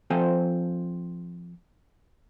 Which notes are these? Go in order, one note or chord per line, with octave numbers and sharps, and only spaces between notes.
F3 C4 F4 A4 C5 G#5